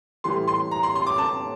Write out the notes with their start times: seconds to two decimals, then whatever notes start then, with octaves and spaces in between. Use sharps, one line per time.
0.24 A2 E3 G3 C6
0.48 C6
0.71 A#5
0.83 C6
0.96 C6
1.06 D6
1.18 A5